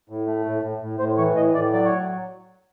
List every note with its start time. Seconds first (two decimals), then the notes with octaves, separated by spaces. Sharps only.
0.10 A2
0.27 A3
0.46 A2
0.63 A2
0.82 A2
0.99 A2 C5
1.18 E3 C#5
1.36 A2 D#5
1.54 A2 D5
1.72 F#3 D5
1.85 C#5